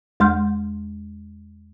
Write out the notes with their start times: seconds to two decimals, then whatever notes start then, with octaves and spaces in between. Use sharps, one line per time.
0.20 E2 G#3 C6 F6 G6